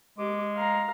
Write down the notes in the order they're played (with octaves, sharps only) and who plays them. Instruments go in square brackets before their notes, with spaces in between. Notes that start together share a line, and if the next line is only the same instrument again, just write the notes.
[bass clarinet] G#3 [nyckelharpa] G4 D6
[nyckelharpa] F5 A#5